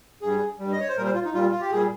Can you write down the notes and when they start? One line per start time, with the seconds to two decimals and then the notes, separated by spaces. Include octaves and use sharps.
0.22 G2 G3 G#4
0.59 G2 G3
0.72 D#5
0.80 C#5
0.88 C5
0.96 A#2 G3 A#4
1.06 C5
1.15 F4
1.25 D#4
1.33 A#2 G3 F4
1.51 F4
1.61 G4
1.70 A#2 G3 G#4